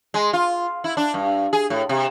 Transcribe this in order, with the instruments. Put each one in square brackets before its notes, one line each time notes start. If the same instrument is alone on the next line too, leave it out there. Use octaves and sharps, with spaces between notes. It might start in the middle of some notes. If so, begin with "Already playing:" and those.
[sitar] G#3
F4
E4
D4
G2
G#4
A2
C3